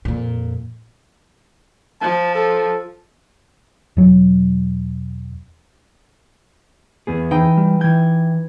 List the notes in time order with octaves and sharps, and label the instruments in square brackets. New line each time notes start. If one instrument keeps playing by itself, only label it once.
[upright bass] F2 A#2
[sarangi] F3 [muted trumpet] A5
[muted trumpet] A4
[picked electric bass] E1 F#3
[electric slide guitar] E2 B3 G#4
[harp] E3 D#4 G5
[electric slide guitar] G3
[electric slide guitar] E3 G5 [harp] G#6